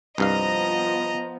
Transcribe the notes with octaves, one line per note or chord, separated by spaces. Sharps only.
C2 G2 F3 B3 D#5 F5 A#5